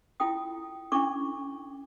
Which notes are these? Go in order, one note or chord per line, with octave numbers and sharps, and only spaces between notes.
E4 F4 A4 G5 D#6
C#4 D4 E4 A4 C#6 D6